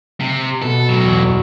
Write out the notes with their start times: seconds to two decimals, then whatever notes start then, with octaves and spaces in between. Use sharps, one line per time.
0.20 C3
0.62 B2 B3 A4
0.89 A2 F#3
1.03 B1 E2
1.27 F#2 C#6